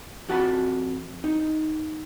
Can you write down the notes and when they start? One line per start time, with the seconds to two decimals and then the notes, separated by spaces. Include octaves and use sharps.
0.29 F2 F#4 A5 B5
1.24 D#4